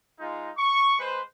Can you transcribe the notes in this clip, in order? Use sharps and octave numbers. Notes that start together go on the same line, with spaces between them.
G#3 D#4 F4
C#6
G#3 B4 C5